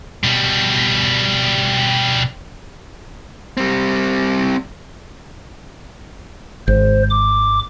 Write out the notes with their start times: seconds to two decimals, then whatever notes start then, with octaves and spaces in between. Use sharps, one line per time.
0.24 B2 G3
3.57 G3 C4
6.68 G#1 C5
7.10 D6